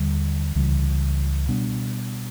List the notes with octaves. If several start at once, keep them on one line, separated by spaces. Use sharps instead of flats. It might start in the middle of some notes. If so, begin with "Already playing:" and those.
Already playing: D#2 D3 G3
C#2 C#3 E3 G3
B2 G3 B3 D4